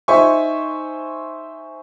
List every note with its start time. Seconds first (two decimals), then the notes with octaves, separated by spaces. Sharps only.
0.08 D#4 C5 E5 G#5 C#6